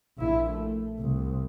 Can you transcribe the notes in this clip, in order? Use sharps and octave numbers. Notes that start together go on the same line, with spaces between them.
A#1 E4
A3
C2